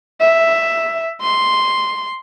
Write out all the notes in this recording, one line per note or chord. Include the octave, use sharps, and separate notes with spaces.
E5
C6